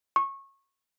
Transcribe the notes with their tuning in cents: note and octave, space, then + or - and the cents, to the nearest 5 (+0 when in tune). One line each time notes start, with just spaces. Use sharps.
C#6 -20